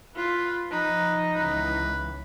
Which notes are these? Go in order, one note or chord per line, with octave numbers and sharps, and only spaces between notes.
F4 B4
F3 D#4 B4
C#2 E3 B4